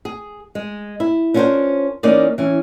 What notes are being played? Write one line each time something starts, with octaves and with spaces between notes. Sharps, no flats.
G#4
G#3
E4
C#4 D4 F4 G4 A#4 C5
E3 A#3 C#4 D#4 G#4 D5
E3 C#4